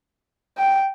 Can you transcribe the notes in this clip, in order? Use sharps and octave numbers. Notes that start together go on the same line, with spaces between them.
G5